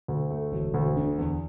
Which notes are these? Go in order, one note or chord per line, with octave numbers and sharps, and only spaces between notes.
D2
A3
E1
D2
D3
E2